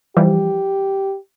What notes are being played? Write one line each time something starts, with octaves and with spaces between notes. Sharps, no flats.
E3 F3 G3 G4